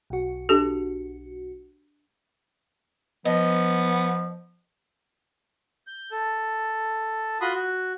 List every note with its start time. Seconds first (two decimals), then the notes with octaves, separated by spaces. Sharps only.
0.10 B1 F#4
0.49 D4 G4 A4
3.25 F3 B3 D#5
5.87 G6
6.12 A4
7.41 F4 F#4 B5 C6 D#6
7.54 F#4